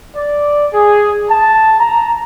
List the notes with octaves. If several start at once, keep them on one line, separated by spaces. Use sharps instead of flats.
D5
G#4
A5
A#5